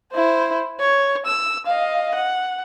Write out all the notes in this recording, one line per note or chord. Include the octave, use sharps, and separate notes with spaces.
E4 C5
C#5
E6
D#5 F5
F#5